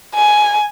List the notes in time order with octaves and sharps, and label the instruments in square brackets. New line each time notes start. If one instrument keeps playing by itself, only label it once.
[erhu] G#5